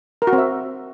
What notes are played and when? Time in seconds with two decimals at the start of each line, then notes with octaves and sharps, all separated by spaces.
0.22 A#4
0.27 F#4
0.33 C4
0.38 E5